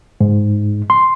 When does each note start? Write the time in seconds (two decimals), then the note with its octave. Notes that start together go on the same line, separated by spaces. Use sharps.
0.21 G#2
0.90 C6